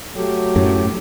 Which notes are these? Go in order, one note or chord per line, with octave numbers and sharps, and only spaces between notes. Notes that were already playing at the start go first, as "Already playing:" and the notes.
F#3 A3 G4
F#2 A2